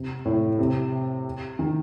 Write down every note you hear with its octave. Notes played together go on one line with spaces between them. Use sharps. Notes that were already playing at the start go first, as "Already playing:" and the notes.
Already playing: C3
A2
C3
D#3